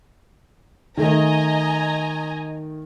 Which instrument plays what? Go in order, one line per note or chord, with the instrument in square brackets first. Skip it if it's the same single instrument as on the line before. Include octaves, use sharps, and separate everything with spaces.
[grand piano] D#3 A3 [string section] D#5 G#5 A#5